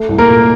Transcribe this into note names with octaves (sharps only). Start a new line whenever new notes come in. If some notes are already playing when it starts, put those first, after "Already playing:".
Already playing: A3
C2
A#3 A#4
A#2